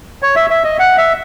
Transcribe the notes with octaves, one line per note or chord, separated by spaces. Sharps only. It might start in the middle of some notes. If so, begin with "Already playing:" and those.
C#5
E5
E5
D#5
F#5
E5